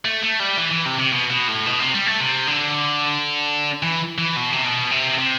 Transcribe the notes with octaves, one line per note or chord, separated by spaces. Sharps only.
A3
A3
G3
E3
E3
C3
C3
B2
B2
A2
B2
C3
G3
A3
C3
D3
E3
E3
B2
C3
B2
C3
C3